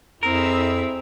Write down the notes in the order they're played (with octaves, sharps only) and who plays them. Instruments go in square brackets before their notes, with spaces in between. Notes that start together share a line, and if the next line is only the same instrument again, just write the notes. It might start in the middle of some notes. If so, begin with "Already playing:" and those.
[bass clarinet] F2 [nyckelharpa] C4 [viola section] E4 G#4 E5 [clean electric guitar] A#4